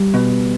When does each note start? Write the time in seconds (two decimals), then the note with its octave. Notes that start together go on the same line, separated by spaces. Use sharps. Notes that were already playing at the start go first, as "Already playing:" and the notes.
Already playing: G3
0.14 B2